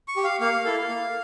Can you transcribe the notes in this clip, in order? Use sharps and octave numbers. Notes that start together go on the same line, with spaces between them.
C#6
G4
F5
A#3 F5
E4 A4
A#3